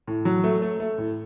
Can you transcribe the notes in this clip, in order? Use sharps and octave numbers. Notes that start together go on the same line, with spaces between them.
A2
F#3
A3
A3
A3
A2